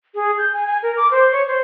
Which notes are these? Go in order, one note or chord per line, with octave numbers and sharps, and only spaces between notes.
G#4
G6
G#5
G#5
A#4
D6
C5
C#5
C5